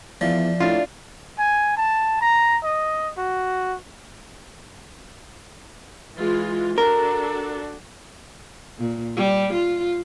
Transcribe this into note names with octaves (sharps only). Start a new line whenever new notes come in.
E2 F3 D5 E5 F5
A2 D4 F4
G#5
A5
A#5
D#5
F#4
E3 G#3 F4
D4 F#4 A4 A#4
A#2
G3
F4